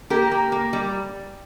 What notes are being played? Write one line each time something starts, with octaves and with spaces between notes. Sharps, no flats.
A#3 G4 A#4
A#3
A#3
G3